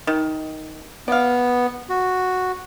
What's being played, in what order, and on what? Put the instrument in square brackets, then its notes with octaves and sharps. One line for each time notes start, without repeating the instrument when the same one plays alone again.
[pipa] D#3
[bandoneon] B3 [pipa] D5 F5
[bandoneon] F#4